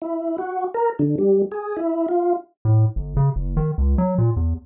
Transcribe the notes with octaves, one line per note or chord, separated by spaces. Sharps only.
E4
F#4
A#4
D3
G3
G#4
E4
F4
A2
G1
C#3
F#1
D#3
C#2
F#3
A#2
E2